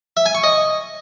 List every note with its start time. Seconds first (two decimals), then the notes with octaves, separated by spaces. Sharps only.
0.17 E5
0.26 G#5
0.35 C#6
0.44 D#5